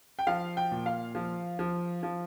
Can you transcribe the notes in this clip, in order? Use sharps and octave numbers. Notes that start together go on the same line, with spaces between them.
G5
F3 F5
G5
A#2
F5
F3
F3
F3